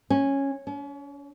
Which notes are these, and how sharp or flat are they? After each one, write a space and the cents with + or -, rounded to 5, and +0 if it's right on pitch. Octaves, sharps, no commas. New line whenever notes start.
C#4 -10
C#4 +40